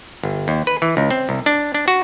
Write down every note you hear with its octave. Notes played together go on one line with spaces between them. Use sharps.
G1
D#2
B4
E3
C#2
C4
C2
D4
D4
F#4